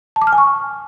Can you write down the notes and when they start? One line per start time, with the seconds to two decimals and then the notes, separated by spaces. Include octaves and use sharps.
0.16 A5
0.22 D6
0.27 F6
0.33 G#5
0.38 C#6